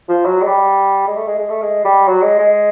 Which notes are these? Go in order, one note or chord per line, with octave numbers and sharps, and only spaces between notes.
F3
F#3
G#3
G3
G#3
A3
G#3
G#3
A3
G#3
G3
F#3
G#3
G#3